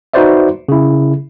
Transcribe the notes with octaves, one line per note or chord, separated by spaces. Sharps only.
D#4 F#4 B4 C5 D5 E5
C#3 E4